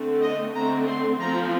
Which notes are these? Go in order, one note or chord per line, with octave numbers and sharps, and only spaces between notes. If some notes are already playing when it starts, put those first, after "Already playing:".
Already playing: D3 A3 C4
D#5
D3 A3 C4 A#5
C6
F3 C4 A#5